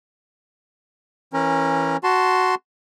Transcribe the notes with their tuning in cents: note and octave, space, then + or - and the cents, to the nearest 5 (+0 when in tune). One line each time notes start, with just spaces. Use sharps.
E3 +0 C#4 -25 A#4 +0
F#4 +5 A5 +0 C6 +0